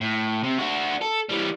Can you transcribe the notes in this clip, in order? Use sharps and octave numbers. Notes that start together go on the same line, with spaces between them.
A2
C3
D4 F#4
A4
E3 G3